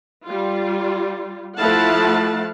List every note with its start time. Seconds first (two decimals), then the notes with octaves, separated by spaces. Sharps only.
0.25 G3 F4
1.56 F3 A3 E4 F5 F#5 A5